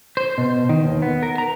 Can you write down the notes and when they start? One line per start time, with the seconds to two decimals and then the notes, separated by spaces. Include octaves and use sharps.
0.17 C5
0.38 B2
0.69 D#3
0.84 D#2
1.02 B3
1.23 A#4
1.38 A#5